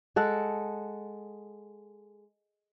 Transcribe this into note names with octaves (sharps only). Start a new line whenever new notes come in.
G#3 A4 F#5